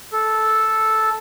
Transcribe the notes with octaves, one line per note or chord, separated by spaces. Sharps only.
A4